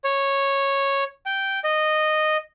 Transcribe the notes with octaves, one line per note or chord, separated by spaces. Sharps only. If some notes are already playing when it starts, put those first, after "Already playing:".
C#5
G5
D#5